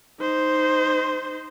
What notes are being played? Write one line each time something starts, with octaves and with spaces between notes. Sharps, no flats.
D#4 C5